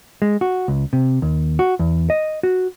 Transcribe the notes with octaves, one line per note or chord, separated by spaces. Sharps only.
G#3
F#4
C#2
C3
D#2
F#4
E2
D#5
F#4